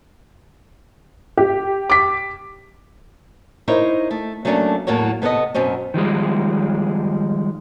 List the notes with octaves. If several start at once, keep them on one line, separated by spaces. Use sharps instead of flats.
G4
D6 B6
D#4 E4 A#4 C5 C#5
A3
F#3 A3 A#3 C#4 D4
E2 A2 F#3 A#3 C#5
C3 B3 A4 A#4 D#5
F#2 B2 C4 C#4
D#3 F3 G3 G#3